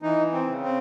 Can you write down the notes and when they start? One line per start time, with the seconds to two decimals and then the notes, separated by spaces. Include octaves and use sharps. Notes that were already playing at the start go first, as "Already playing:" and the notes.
0.02 E3 D#4
0.32 C4
0.47 C#3
0.63 C4